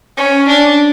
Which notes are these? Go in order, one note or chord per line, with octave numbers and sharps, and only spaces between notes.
C#4
D4